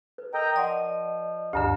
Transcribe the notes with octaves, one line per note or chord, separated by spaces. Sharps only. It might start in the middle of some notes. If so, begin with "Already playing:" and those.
B4
A#4 D#5 G5 A#5
F3 D5 D#5 F#5 C6 C#6
D2 G2 D3 G4 A5